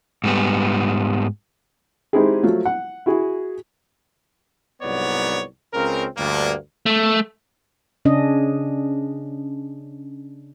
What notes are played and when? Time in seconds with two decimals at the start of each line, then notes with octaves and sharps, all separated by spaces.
0.24 G#2 G3 B3
2.13 G#3 C4 D#4 E4 G4 G#4
2.43 F3 F#3 A3
2.65 F#5
3.06 E4 F#4 G#4
4.82 C2 G#2 F#3 B3 C#5 D5
5.74 C#2 C#3 C4 A#4
6.18 D2 G2 A#3
6.86 A3
8.05 C#3 C#4 D4 D#5